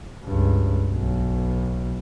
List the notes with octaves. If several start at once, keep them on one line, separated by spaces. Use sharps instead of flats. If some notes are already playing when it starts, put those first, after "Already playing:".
C#2 G2
B1